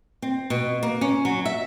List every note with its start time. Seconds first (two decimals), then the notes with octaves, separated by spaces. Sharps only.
0.22 C4
0.50 B2
0.83 A#3
1.01 C#4
1.25 F#3
1.45 E5